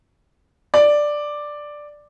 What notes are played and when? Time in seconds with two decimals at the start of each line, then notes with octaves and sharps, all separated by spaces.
0.74 D5